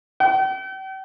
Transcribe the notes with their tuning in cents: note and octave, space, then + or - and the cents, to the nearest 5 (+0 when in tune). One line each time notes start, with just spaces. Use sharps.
G5 -40